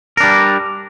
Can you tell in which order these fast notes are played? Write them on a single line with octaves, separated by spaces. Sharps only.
A#4 D4 G3